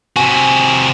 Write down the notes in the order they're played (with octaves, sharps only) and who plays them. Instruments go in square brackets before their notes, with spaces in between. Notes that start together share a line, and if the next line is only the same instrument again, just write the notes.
[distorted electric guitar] C3 F#4 [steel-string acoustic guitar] G#5